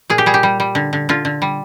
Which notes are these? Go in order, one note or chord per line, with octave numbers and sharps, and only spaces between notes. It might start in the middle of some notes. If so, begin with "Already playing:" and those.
A#2 G#4
G4
G3 G#4
G4
G3
G3
D3
D3
D3 F4
D3
G3